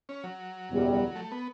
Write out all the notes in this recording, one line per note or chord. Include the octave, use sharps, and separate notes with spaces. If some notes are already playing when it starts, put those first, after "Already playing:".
C#4
F#3
F#1 E2 B2 G3
A3
B3